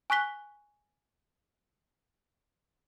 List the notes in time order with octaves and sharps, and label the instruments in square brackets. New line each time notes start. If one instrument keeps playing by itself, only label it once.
[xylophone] G#5 C#6 F#6 B6 G7